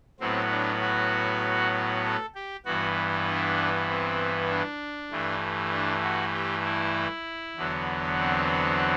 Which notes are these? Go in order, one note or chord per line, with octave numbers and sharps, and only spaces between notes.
A2 F#3 B3 C4
D4
F#4
A4
G4
G2 E3 B3 F#4
D4
C4
D4
G2 E3 A3
D4
F#4
G4
E4
E2 D3 F#3 B3
C4